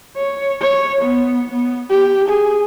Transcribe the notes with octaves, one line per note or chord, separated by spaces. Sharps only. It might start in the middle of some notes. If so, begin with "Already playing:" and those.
C#5
C#5
B3
B3
G4
G#4